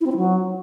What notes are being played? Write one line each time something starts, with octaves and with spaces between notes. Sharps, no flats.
E4
C4
E4
F#3